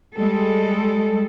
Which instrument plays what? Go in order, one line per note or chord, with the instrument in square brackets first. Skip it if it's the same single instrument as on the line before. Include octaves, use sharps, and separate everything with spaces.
[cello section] G3 G#3 A4